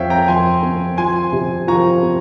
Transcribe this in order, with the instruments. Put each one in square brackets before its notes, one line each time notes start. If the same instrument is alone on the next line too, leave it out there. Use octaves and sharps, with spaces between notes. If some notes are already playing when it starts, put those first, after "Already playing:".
Already playing: [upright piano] F2 C4 [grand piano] C#5 E5 F5 G5
[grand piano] G5 A#5
[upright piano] F2 [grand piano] G#5 C6
[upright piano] C4
[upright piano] F3 [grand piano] G#5 C6
[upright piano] C3
[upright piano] F3 [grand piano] A#5 C#6
[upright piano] C4